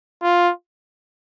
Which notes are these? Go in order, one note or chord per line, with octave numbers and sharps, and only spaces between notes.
F4